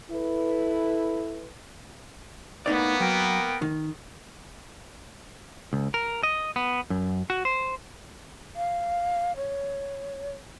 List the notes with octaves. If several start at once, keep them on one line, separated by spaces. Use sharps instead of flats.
E4 A4 B4
A2 A#3 B3 D#4 D5
F#3 A#4 G5
D#3
C#2
A#4
D#5
B3
F#2
F#4
C5
F5
C#5